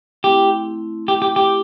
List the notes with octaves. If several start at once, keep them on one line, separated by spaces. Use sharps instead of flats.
A3 C4 E4 G4
G4
G4
G4